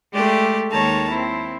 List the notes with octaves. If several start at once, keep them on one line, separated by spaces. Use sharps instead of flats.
G#3 A3 G4 D5
D#2 D#3 G#3 C#5 A5 A#5
C4 E4